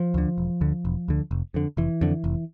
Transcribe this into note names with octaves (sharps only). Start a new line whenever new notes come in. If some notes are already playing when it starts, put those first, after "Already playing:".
Already playing: F3
D2 D3
E1
D2 D3
E1
D2 D3
F1
F2 D3
F1 E3
F2 D3
F1